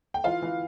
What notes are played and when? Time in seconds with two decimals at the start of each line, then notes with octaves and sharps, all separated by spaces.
0.14 G5
0.24 E3 F4 F5
0.42 E3